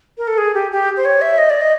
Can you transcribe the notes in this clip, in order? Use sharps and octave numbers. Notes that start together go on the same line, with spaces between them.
A#4
A4
G#4
G4
G4
C5
C#5
E5
D#5
D5
D#5